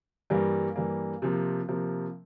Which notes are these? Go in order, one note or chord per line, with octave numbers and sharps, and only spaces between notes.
G2 E3 G3 A#3
G2 E3 G3 A#3
C3 F3 A#3
C3 F3 A#3